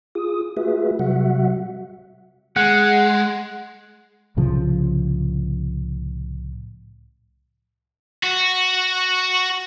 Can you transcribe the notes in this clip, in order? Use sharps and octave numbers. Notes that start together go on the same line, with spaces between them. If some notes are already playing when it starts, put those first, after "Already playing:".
F4 G#4 D#6
A3 F4 F#4 G#4 B4 E5
C3 F#3 G3 F#4 E5 F#5
G#3 F#5
C2 A2 C#3 F3
F#4